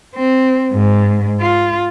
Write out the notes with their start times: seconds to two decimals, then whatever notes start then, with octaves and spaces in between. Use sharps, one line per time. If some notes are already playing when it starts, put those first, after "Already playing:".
0.15 C4
0.72 G#2
1.41 F4